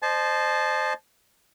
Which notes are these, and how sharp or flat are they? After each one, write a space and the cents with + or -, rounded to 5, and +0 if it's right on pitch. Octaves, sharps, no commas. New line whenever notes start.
C5 +0 D#5 -35 A5 -25